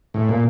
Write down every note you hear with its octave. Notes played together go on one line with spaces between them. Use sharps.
A2
A#2